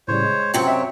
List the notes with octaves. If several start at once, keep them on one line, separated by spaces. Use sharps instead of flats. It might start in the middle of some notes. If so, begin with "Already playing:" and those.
A2 C#3 G3 C5 C#5
G#3
F#2 C3 C4 F4 C#5
D#5 E5 G5